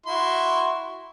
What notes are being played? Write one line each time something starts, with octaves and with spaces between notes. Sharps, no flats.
E4 F#4 C6